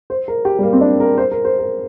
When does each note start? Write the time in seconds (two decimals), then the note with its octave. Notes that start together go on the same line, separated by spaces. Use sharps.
0.10 C5
0.28 A#4
0.45 G4
0.59 G3
0.63 A#3
0.73 C4
0.81 D4
1.00 A#4
1.18 C5
1.31 A#4
1.45 C5
1.59 A#4